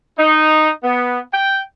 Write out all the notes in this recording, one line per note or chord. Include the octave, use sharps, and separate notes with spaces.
D#4
B3
G5